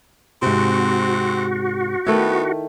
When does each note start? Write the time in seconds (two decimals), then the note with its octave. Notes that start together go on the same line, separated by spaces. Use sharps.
0.42 G#2 C3 C4 F#4
2.06 D#3 A3 B3 E4